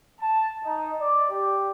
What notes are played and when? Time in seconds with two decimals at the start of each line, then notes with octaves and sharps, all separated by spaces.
0.20 A5
0.63 D#4
1.00 D5
1.29 G4